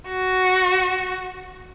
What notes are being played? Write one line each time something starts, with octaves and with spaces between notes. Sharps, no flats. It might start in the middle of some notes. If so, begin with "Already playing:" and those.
F#4